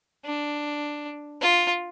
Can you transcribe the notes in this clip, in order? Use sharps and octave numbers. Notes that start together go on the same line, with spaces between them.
D4
F4